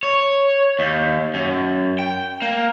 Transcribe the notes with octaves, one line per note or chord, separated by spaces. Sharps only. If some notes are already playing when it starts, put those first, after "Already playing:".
C#5
D#2
F#2
G5
A#3